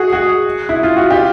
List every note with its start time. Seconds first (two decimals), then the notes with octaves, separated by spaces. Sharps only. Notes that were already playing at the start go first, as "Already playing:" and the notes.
Already playing: F#4 G#4
0.13 F#4 G#4
0.69 E4
0.83 F4
0.97 F#4
1.10 F4 G4